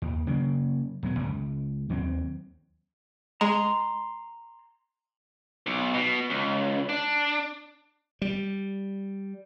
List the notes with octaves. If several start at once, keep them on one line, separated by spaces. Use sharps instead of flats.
D#2
C#3 F#3 A#3
D#1 F#3 B3
C#2
D#2 F#3 A#3 C4
G#3 A#5 C6
B1
B2
C#2
D4
G3